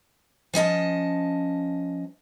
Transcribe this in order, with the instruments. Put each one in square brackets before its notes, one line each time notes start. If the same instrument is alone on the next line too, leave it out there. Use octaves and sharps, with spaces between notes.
[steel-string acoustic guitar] F3 C#4 D#5 A5